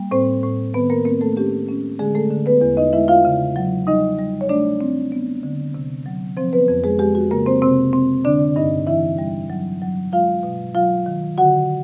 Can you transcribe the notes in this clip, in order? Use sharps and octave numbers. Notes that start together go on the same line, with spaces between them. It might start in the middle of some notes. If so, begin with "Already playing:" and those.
Already playing: G3 A#3
A2 C4 C5
A2
D#3 B3 B4
A#3 A#4
A#3 C4 A#4
A3 A4
C#4 G4
C#4
D3 G#3 G#4
A3 A4
D3
B3 B4
E2
D#4 D#5
G#3 E4 E5
F4 F5
C#3
F#3
G3 D#4 D#5
G3
C#5
A3 D4 D5
C4
B3
D3
C3
F#3
F3 C4 C5
B3 B4
F2
G#3 G#4
G#3 G4
F#4
C#3 A#3 A#4
C4 C5
C3 C4 C5
C4
D3 D4 D5
G2 D#4 D#5
E3 E4 E5
G3
F#3
F#3
G#3 F4 F5
B2
F#3 F4 F5
D#3
D3 F#4 F#5